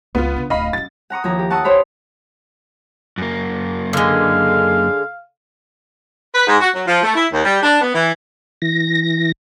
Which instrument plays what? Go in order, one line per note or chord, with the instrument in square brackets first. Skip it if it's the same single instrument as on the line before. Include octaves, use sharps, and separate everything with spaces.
[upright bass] C#2 C4 [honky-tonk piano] B3 F4
[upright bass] C#3 D4
[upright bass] D1 G#2 [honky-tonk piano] D#5 F5 B5
[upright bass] F#3 C#4 [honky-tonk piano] A6
[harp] F#5 A#5 C#6 D#6
D#2 F3 E4 A#5
G4
F#5 A5 C#6 D#6 E6
D#4 G4 C5 C#5 B5
[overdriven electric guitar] F#2 A#3
[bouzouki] D3 G#3 [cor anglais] F5
[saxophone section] B4
G#2
F#4
F#3
F3
A3
E4
D#2
G3
D4
B3
E3
[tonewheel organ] E3 A#6